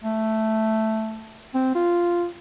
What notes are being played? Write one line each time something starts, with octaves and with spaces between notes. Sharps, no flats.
A3
C4
F4